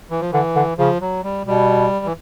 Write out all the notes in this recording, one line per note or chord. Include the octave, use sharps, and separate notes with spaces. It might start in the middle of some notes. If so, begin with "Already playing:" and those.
E3
F3
D3 E3
D3
C#3 F3
F#3
G3
B2 G3
E3